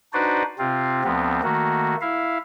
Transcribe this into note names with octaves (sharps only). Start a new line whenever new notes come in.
D4 D#4 F#4 B4 C5 D5
C3 C4 F4
D2 F3 B3 C4
D#3 A3 A#3 F#4
E4 E5 F5